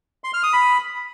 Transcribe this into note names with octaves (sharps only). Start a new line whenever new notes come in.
C6
F6
D#6
B5